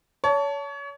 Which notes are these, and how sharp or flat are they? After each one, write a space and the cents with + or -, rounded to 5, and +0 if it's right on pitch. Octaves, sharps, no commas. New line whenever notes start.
C#5 +30 A5 +0